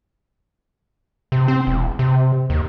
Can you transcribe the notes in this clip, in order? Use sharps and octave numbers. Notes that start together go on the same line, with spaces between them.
C3
C4
E1
C3
D#2